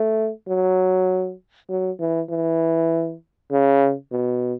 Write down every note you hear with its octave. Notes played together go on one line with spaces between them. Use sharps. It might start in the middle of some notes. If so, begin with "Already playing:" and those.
Already playing: A3
F#3
F#3
E3
E3
C#3
B2